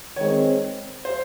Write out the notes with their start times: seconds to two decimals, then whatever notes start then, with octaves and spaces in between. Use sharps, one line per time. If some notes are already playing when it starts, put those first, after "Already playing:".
0.16 D#3 G#3 C4 C#5
1.05 C5